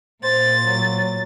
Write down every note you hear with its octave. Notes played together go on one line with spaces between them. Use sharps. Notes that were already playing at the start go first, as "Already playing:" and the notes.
A#2 C5 A6
F#3